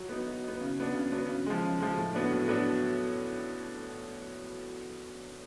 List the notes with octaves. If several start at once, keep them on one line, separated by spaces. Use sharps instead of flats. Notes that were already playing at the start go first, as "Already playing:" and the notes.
Already playing: F#3
B3 D#4
F#3
B3 D#4
C#3
F#3 B3 D4
C#3
F#3 B3 D4
C#3
F3 G#3
C#3
F3 G#3
A2
F#3 B3 D4
A2
F#3 B3 D4